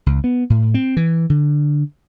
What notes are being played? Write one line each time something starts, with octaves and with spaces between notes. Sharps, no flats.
C#2
B3
A2
C4
E3
D3